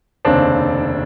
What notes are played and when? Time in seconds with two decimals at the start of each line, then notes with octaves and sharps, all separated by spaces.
0.25 F1 D#2 C#3 C4 D4